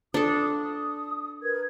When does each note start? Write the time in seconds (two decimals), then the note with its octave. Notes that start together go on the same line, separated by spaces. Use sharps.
0.14 D4 F4 A4 D#6
0.61 D#6
1.43 A#4 B4 G#6